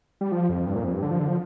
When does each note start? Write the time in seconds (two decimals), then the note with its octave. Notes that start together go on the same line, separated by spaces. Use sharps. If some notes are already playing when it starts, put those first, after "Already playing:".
0.21 G3
0.32 F3
0.49 F2
0.66 G2
0.76 A#2
0.84 F2
0.94 G2
1.02 D3
1.11 F3
1.19 D3
1.28 F3